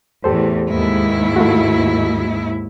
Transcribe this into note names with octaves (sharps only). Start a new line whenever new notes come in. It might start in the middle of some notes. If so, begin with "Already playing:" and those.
E2 A2 G4 A4 C5
D#2 G#2 E4
A3 F4 F#4